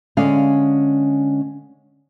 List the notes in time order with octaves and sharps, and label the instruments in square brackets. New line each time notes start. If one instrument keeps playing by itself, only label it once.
[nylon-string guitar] D3 G#3 C#4 F5